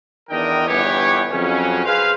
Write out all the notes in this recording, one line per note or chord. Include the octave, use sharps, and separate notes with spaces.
E2 D#3 D4 A#4 D#5 G5
G1 E3 B3 G4 C#5
F2 C#3 F#3 C#4
G#4 B4 C5 F5